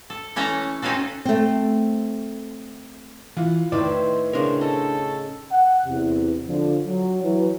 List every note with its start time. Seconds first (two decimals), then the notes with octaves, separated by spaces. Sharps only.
0.10 A4
0.36 E3 A3 C#4 A4 C#5 A#5
0.82 C4 C#4 D#4 F4 F#4 A4
1.25 A3 C4
3.37 E3 E4 F4 F#5
3.72 A2 D#3 D#4 E4 B4 C5 D5
4.33 C#3 D4 A#4 C5 C#6
4.61 A4 D#5
5.52 F#5
5.85 E2 C3
6.48 D3 F3
6.87 F#3
7.23 E3 F#3